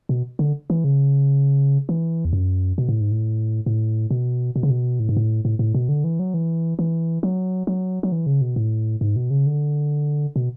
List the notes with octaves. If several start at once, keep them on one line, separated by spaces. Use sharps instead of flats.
B2
D3
E3
C#3
E3
E2
F#2
B2
A2
G#2
A2
A2
B2
B2
C#3
B2
A2
G#2
A2
A2
A2
B2
D3
E3
F#3
E3
E3
F#3
F#3
F#3
E3
C#3
B2
A2
G#2
B2
C#3
D3
B2